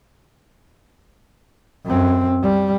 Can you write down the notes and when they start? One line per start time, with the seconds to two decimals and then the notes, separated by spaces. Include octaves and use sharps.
1.85 F#2 C4
2.43 G3